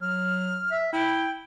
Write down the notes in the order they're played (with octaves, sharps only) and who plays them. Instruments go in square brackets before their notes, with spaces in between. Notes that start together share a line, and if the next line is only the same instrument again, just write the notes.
[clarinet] F#3 [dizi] F6
[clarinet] E5
[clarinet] E4 [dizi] G5